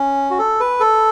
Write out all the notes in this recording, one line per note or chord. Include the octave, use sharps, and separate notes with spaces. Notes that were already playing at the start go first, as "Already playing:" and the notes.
Already playing: C#4
F#4
A4
B4
A4